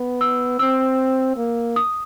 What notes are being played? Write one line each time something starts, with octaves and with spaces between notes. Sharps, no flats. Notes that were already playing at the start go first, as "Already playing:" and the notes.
Already playing: B3
E6
C4 E6
A#3
D#6